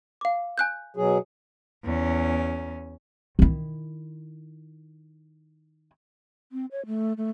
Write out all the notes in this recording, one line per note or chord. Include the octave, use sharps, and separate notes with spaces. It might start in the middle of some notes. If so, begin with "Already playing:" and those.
F5 D6
G#5 F#6 G6
B2 F#3 G#4
E2 C#4
D#3 E4
C4
C#5
A3
A3